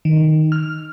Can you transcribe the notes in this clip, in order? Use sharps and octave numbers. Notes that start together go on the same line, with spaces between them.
D#3
F6